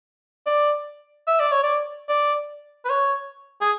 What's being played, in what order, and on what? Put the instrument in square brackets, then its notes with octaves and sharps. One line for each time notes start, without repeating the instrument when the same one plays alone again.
[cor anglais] D5
E5
D5
C#5
D5
D5
B4
C#5
G#4